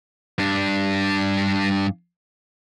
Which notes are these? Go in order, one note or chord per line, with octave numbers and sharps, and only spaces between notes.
G2 D4